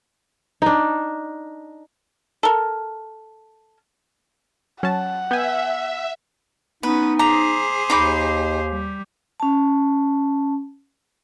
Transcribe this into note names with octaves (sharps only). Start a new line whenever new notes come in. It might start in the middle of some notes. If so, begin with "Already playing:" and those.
D4 D#4
A4 A#4
F#3 C#4 F#5 A5
B3 E5 G5 G#5 G6
B3 C#4 D#4 B4
G#4 C5 A#5 D6 B6 F7
D#2 D#4 B5 D6 G6 F7
G3
C#4 A5